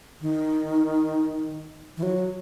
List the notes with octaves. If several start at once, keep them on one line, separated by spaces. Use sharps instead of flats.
D#3
E3
F#3